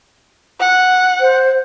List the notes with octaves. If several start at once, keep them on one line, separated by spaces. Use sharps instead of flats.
F#5
C5